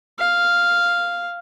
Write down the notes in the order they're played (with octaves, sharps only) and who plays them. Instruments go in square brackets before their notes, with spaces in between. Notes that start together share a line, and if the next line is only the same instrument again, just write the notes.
[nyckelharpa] F5